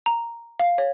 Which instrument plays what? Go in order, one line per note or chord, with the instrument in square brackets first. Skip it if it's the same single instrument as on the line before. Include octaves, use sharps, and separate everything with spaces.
[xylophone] A#5
F5
C#5